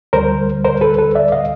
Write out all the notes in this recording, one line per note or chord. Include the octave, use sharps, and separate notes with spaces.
D2 D3 G3 A#4 C5
A#4 C5
A4 B4
A4 B4
D5 E5
D#5 F5